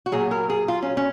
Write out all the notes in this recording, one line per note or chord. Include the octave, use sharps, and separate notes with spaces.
F#4
A#2 F#3 G#4
A#4
G#4
F4
C#4
C#4